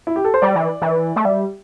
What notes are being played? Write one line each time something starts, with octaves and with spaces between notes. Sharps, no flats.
E4
G4
A4
C5
G3 D5
E3
E3
A3
G3 E5